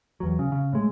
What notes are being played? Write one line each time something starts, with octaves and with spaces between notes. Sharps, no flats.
E2 F#3
C#3
C#3
A2 G#3